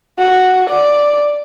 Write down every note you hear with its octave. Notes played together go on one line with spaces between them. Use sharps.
F#4
D5